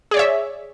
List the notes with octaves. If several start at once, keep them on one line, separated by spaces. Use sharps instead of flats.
G#4 C#5 D5 E5